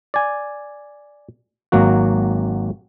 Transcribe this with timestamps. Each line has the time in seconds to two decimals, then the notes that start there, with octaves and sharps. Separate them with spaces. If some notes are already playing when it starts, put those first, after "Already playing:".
0.14 D5 G#5
1.72 G#1 F#3 A#3 F#4